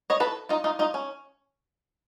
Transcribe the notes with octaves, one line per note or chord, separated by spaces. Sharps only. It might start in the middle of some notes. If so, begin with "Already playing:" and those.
C#5 D#5
A4 B4
D#4 F4
D#4 F4
D#4 F4
C#4